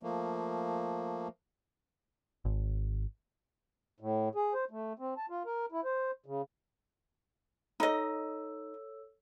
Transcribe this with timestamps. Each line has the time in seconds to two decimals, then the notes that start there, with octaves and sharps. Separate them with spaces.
0.03 F3 A3 A#3
2.45 G#1
4.00 A2
4.35 G#4
4.54 C5
4.71 A3
4.99 C4
5.17 A5
5.30 F4
5.45 A#4
5.72 E4
5.84 C5
6.26 C#3
7.80 D#4 A4 C#5 D#5 E6